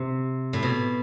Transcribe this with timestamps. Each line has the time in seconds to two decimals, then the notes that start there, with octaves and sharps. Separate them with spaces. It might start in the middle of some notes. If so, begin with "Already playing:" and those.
Already playing: C3
0.53 A2
0.63 B2